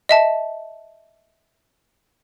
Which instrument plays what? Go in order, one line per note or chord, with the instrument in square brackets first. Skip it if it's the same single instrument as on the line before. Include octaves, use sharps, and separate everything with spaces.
[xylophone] D#5 E5 A5